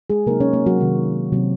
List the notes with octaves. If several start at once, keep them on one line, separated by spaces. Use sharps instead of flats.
G#3 G#4
C3 F#3 A#3 C4 D#4 A#4
C#4 C#5
A#3 A#4
F#3 F#4
C3 D#3 F#3 C#4
C3 F#3 C4